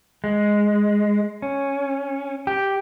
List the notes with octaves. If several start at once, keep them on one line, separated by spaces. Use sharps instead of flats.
G#3
C#4
G4